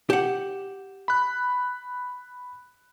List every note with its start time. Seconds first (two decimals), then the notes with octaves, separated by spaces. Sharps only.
0.10 G4 F#5 E7
1.08 B5 F#6